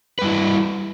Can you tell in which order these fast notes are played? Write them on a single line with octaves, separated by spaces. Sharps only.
B4 G3 E4